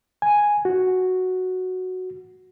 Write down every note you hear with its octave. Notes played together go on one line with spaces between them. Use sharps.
G#5
F#4